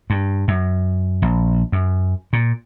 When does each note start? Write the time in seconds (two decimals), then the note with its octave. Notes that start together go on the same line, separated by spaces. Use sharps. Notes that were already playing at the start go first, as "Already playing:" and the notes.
0.10 G2
0.48 F#2
1.22 A#1
1.72 F#2
2.33 A#2